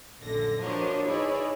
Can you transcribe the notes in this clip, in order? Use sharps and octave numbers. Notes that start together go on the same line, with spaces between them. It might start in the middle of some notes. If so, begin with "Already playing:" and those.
A#1 F#2 D3 A#6
F3 D4 F#4 A#4 C#5 D#5
D#4 E4 G#4 B4 C#5 D5